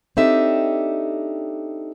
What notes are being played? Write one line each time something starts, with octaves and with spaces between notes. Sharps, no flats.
C4 D4 D#4 G4 A4 E5